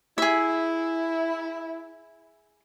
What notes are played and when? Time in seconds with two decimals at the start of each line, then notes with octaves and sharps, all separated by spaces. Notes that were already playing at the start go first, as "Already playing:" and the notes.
0.18 E4 G#4 E5